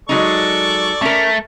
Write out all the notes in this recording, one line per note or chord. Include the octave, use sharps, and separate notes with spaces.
F#3 G#3 D#4 A4 D5 C#6
A3 C#4 A#4